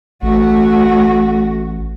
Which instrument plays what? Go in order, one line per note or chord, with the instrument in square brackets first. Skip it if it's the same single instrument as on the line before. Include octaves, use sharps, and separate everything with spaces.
[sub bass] A1 [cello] A3 F#4